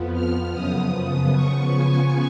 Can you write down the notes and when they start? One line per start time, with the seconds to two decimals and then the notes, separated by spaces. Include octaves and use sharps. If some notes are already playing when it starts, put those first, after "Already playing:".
Already playing: F2 F3 B3
0.13 F6
0.53 F#2 C#3 F3 B3 D#6
1.34 C#3 F3 B3 C#6
1.74 G#5